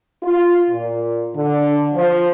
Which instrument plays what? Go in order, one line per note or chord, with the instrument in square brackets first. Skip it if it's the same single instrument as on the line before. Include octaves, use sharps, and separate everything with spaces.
[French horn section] F4
A#2
D3
F3